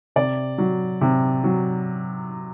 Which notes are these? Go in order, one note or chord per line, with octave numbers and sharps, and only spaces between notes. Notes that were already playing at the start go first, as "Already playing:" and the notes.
C3 D5
F#3
C3
F#3